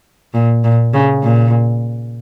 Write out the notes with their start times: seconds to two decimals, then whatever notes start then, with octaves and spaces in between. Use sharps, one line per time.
0.34 A#2
0.64 A#2
0.94 C#3
1.23 A#2